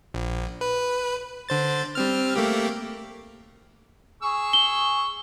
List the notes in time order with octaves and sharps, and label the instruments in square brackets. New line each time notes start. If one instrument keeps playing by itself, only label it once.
[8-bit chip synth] A#1
B4
D3 C5 A6
G3 C4 F6
A3 A#3 G4
[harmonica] G#4 C#6 E6
[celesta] G7